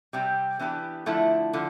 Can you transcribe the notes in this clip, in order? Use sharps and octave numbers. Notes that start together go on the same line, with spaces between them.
C3 G3 C4 G4
E3 B3 D4 G4
D3 F3 A3 E4
D3 F3